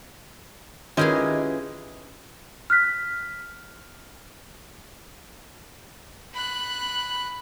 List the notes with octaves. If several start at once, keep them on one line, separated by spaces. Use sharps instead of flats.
D#3 C#4 E4 F4 G4 G#4 B4 D#5
F6 F#6 B6
B5 F#6